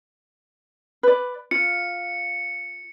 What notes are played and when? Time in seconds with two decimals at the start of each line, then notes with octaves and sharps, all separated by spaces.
1.03 B4 D5
1.51 F4 C#7